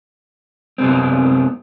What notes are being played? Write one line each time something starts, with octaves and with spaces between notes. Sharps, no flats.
F#2 C3 B3 C4